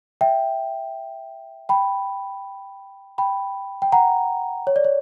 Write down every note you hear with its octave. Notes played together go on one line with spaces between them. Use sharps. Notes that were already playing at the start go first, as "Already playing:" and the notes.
E5 G5
G5 B5
G5 B5
G5
F#5 A#5
C#5
D5
C#5